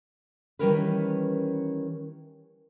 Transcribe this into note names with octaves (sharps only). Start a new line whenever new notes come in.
D#3 E3 G3 C#4 A#4 B4